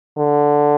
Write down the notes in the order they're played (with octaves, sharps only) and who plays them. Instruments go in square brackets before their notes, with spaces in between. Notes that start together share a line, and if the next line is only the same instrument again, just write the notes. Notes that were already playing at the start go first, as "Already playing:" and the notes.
[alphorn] D3